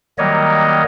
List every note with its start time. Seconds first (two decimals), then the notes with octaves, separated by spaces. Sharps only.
0.18 D#3 F#3 G3 A#3 C#5 D#5